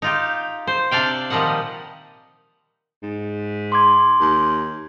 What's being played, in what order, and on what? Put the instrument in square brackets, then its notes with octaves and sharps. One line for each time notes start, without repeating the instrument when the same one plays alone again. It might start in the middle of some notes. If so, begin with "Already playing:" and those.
[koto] D#4 F4 G4
C5
C3 D4 D5 F5 G5
A#2 D#3 F3 G3 D#5 F#5
[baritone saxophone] G#2
[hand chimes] C6 D6 G#6
[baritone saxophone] D#2